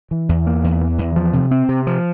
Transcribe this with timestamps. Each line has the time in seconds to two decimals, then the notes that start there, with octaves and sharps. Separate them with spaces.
0.11 E3
0.29 E2
0.47 A#3
0.64 E2
0.81 E3
0.98 E2
1.16 F3
1.33 C3
1.51 C4
1.69 C3
1.87 F3